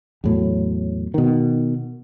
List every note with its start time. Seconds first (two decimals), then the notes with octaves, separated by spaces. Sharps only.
0.24 E2 A2 F#3
1.14 B2 D#3